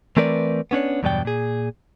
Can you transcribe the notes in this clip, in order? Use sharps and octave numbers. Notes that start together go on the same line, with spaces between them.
E3 A3 C4 A#4 B4 D5
B3 C#4 D4 C#5
E2 G2 B2 F#3 D5 G5
A#2 G#4